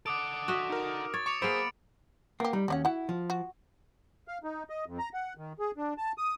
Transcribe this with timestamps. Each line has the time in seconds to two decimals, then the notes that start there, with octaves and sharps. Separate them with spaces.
0.06 A4 F#5 D6 D#6 D7
0.48 F#4 D#5 E5
0.70 D#4 A#4
1.14 C#5 A6
1.26 C#6 D6 C#7 F7
1.42 A#3 B3 G#4 C5 E5 B5 D7
2.40 A#3 B3 G4
2.53 G3 D#4
2.68 D#2 C#4 F#4 D5 F#5
2.85 E4 F#4 F#5
3.09 F3
3.30 F#4
4.28 F5
4.44 D#4
4.70 D#5
4.86 F2
4.99 A#5
5.14 F#5
5.37 D#3
5.59 G#4
5.77 D4
5.98 A5
6.18 D#6